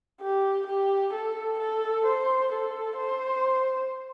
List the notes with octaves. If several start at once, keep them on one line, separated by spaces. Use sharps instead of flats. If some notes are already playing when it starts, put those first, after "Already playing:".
G4
G4
A4
A4
C5
A4
C5